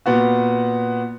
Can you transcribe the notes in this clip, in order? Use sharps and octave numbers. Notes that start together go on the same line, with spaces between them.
A#2 B3 F#4